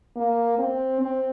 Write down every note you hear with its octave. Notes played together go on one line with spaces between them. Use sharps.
A#3
C4
C4